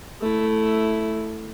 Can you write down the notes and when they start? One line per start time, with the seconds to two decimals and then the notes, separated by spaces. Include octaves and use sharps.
0.21 A3 E4